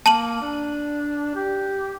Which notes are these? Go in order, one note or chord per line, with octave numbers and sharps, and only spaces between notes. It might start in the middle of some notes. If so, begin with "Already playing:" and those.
A#3 A5 D#7 F#7
D4
G4